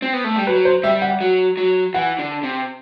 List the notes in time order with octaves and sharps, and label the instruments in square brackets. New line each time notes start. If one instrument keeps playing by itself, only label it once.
[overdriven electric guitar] C4
B3
A3
G3
[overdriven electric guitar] F#3 [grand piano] B4
[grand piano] C5
[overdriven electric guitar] G3 [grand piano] E5
[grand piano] F#5
[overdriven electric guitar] F#3
F#3
[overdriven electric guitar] E3 [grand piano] F#5
[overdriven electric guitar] D3
C3